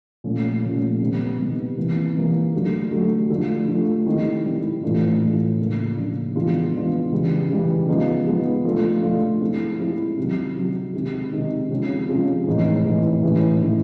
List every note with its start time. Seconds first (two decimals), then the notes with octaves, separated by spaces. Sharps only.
0.24 A#2 F3 A3 C#4
0.63 A#2 F3 A3 C#4
1.01 C3 D#3 G3 B3
1.38 C3 D#3 G3 B3
1.77 C3 E3 G3 A#3
2.15 C3 E3 G3 A#3
2.54 D3 F#3 A3
2.91 D3 F#3 A3
3.30 D3 F3 A3
3.68 D3 F3 A3
4.06 D#3 G3 C4 E4
4.45 D#3 G3 C4 E4
4.83 A2 E3 A3 D4 F4
5.20 A2 E3 A3 D4 F4
5.59 C#3 F3 A#3 D4
5.97 C#3 F3 A#3 D4
6.35 E3 G#3 B3 D4 F4
6.74 E3 G#3 B3 D4 F4
7.12 C#3 E3 G3
7.50 C#3 E3 G3
7.88 F3 G#3 B3 D#4
8.26 F3 G#3 B3 D#4
8.65 F3 A3 D4 F4
9.03 F3 A3 D4 F4
9.41 F3 G#3 C4 E4
9.80 F3 G#3 C4 E4
10.17 C3 D#3 F#3
10.56 C3 D#3 F#3
10.94 C3 D#3 G#3
11.33 C3 D#3 G#3
11.70 C3 F3 G#3 C#4
12.09 C3 F3 G#3 C#4
12.47 A2 E3 G#3 C4 D#4
12.85 A2 E3 G#3 C4 D#4
13.23 A2 E3 G#3 C#4 E4
13.62 A2 E3 G#3 C#4 E4